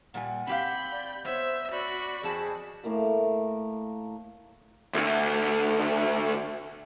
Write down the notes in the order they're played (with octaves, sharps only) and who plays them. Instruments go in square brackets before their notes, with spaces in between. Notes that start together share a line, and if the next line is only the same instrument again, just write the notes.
[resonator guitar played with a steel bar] A#2 G3 G#5 [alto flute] F#5
[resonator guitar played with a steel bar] C4 G4 F5 [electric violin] B5 G6
[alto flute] D5
[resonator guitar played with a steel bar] B3 C#5 [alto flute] C5 [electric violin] E5
[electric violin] F#4 B5 [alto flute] D5
[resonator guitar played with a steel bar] F2 C4 A5 [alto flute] G#4
[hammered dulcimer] A2 A3 A#3 F5
[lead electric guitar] D2 D3